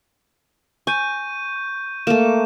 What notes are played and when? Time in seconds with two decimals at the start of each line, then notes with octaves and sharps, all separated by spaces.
0.87 G#5 C#6 G6 D#7
2.07 A3 A#3 E7